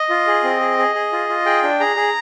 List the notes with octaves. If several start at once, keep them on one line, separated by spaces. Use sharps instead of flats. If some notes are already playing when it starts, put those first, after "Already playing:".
Already playing: D#5
F4
G#4
C4
G#4
G#4
G#4
F4
F4
G#4 G5
D4
G#4 A#5
G#4